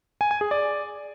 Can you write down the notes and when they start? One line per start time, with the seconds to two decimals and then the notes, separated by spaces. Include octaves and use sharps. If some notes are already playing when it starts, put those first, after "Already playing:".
0.21 G#5
0.31 G#5
0.41 G#4
0.51 D5